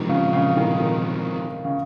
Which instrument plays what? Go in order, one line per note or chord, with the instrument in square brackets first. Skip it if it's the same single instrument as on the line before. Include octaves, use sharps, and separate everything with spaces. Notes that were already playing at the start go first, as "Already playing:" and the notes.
Already playing: [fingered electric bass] C3 F3 G#3 [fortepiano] D#3
[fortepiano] C#3
C#3
D#3
D#3
C#3